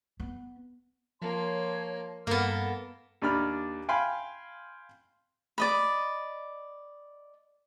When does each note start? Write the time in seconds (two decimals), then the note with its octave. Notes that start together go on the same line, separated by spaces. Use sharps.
0.20 B3
1.22 F3 A#3 C#5 A5 C6
2.27 G2 A#3 B3 A4 F6
3.22 D#2 D4 B5 F6
3.89 F5 G5 G#5 B5 C6
5.58 D5 D#5 B5